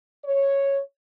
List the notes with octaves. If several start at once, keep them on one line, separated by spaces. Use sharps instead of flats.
C#5